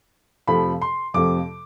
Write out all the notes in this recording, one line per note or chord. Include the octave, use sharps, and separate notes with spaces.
F2 C3 F3 A3 B5
C6
F2 C3 F3 A3 D6